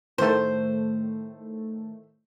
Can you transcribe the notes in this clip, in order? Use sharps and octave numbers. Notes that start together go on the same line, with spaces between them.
A2 D#3 A3 C5